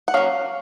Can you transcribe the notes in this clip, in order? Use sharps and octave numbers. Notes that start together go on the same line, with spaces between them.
F#5
F#3 A#3 C#4 F5